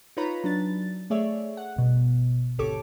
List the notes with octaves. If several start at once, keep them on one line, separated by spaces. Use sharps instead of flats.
D#4 F4 B4 C#5 A#5 B5
F#3 D4 A6
A3 G#4 C#5 D5 E5
F#5
G1 B2
G#1 D2 G4 A4 C#5 D6